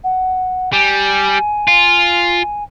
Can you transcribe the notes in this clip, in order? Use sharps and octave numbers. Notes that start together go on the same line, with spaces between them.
F#5
G3 G#5
F4